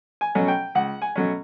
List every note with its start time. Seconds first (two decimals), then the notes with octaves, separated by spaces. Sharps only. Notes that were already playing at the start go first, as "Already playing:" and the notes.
0.21 G#5
0.35 B2 F#3 A3 C#4
0.48 G5
0.75 C#2 F#5
1.02 G#5
1.16 B2 F#3 A3 C#4